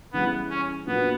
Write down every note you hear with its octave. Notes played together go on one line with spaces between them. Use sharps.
C#3 E3 G3 B3
C#4
A#2 F#3 A#3 B3 D4